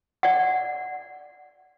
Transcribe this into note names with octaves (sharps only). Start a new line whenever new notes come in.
D5 F#5